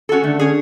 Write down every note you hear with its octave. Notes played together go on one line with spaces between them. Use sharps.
C#4 F#4 A4
D3 A3
C#4 G#4